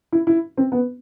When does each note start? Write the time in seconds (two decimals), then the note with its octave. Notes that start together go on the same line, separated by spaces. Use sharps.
0.12 E4
0.27 E4
0.57 C4
0.72 B3